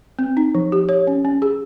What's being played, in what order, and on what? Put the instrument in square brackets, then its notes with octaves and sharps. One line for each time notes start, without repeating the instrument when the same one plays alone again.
[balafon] C4
D#4
F3
G4
C#5
C#4
C#4
G#4